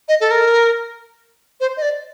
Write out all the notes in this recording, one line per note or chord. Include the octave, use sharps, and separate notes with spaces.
D#5
A4
A#4
C5
D#5
D5